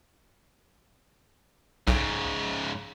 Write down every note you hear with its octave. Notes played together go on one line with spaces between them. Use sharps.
B1 G#2 C#3